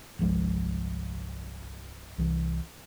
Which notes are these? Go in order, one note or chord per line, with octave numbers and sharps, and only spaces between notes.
G1 C2 F3 G#3
C2 E3